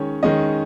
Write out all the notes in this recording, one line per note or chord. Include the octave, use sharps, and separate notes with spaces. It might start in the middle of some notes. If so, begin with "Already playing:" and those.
Already playing: D#3 G#3 C#4 C#5
D#3 G#3 C#4 D#5